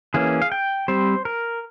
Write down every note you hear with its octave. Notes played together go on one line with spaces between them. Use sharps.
E3 A#3 C#4 G#4
F5
G5
G3 C4 C5
A#4